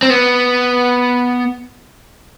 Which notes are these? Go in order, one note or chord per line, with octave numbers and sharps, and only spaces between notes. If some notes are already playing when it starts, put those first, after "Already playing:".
C4
B3